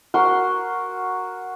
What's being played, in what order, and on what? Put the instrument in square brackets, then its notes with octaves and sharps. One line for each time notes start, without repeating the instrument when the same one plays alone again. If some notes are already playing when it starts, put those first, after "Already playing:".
[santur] F#4 A#4 F#5 C6